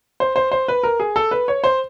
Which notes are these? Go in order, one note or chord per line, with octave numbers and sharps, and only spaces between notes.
C5
C5
C5
B4
A#4
G#4
A4
B4
C#5
C5